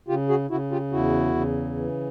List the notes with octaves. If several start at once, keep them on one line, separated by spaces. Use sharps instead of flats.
C#3 F4 G4
F#4 G#4
C#3 E4 F#4
F4 G4
E2 E4 F#4
C#3
E3